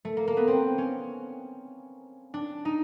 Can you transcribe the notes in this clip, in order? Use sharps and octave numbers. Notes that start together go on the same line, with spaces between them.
A3
A#3
A#3
B3
C4
C#4
D4
D#4